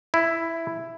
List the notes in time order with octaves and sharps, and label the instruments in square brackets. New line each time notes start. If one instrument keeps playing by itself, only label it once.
[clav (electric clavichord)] E4